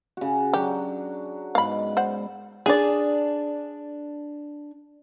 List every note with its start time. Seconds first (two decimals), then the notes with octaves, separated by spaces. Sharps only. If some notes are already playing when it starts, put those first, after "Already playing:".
0.17 C#3 F#4
0.53 F#3 D4 F#4 G4
1.55 G#2 B3 F5 B5
1.97 C5 F#5
2.66 D4 G#4 D5